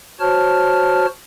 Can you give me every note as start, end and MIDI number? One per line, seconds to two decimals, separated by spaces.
0.20 1.06 66
0.20 1.06 72
0.20 1.06 73
0.20 1.06 81
0.20 1.06 89